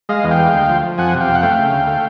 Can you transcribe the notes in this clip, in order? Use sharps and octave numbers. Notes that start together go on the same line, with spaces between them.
G#3 D#5 F5
E2
F5 G5
G#3
D2
F3
F3
F2 F#5 G#5
C3
F5 G5
F2
F#5
A3 F5 G5
C#3
D2
A3